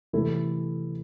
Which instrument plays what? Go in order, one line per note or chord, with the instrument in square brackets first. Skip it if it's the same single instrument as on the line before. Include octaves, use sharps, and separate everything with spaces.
[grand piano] C3 E3 A3 E4 A4